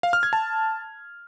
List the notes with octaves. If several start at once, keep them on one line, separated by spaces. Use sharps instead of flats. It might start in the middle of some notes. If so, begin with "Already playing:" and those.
F5
F6
G#6
A5